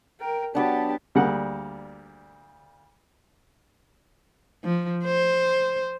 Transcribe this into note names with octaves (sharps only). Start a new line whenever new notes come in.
A#4 G5
F#3 B3 D4 G4 A5
D2 G3 A#3 G#4 F#5
F3
C5